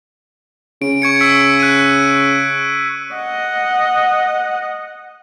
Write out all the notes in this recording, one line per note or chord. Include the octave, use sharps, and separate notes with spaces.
C#3 D7
C#6 G#6 C#7
E6 B6 D7
F#6 D#7
D#5 F#5